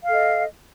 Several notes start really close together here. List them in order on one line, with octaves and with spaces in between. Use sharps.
F5 A4 D#5